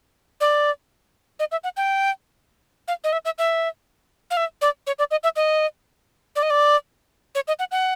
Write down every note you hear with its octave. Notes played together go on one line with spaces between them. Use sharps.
D5
D#5
E5
F#5
G5
F5
D#5
E5
E5
E5
F5
E5
D5
C#5
D5
D#5
E5
D#5
D5
D#5
D5
C#5
D#5
F#5
F#5